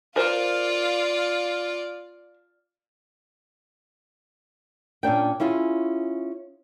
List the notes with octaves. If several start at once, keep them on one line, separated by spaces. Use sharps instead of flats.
F4 A#4 C5 D5 F5
A#2 C#4 D4 G5
C#4 E4 F4 G#4